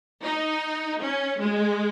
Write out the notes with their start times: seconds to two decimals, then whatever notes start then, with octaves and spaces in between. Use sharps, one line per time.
0.24 D#4
1.01 C#4
1.40 G#3